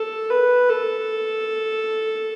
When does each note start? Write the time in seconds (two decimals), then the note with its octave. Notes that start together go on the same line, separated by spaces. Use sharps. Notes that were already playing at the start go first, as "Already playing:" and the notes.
Already playing: A4
0.30 B4
0.69 A4